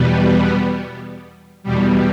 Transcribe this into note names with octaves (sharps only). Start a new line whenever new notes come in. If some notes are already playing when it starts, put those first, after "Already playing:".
Already playing: E2 B2 G3 B3
E2 B2 G3